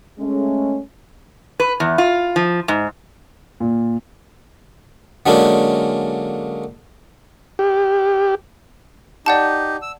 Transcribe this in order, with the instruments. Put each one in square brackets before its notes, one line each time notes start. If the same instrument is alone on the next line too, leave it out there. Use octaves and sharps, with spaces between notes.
[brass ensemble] G#3 A3 C#4
[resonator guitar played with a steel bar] B4
E2
F4
F3
G#2
[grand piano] A#2
[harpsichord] D3 F#3 G#3 A#3 C#4 D4
[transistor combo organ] G4
[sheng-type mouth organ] D#4 G4 [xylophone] D5 F#5 A5
[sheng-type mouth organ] E6